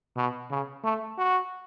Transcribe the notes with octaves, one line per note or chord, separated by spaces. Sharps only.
B2
C#3
A3
F#4